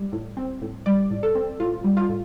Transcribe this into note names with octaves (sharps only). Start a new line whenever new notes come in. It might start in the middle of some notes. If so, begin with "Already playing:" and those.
Already playing: G3
A2
C4
A2
G3 D5
A2
A4
C4
A2 F4
G3
F4
A2